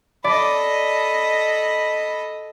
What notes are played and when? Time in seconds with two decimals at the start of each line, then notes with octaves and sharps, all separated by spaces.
0.24 A4 D5 D#5 B5